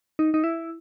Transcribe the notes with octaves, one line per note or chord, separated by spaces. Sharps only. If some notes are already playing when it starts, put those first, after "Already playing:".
D#4
D#4
E4